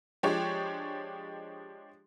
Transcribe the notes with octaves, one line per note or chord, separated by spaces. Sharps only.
F3 G#3 D4 G4 C#5